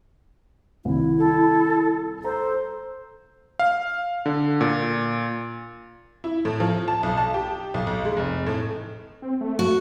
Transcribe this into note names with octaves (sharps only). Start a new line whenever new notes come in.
C2 D#3 E4
A4
A4 C5 A#5
F5
D3
A#2
E4
A2
F3
A5
B1
A5
G4
B1
B1
G#3
F1
A2
C4
A3
F#4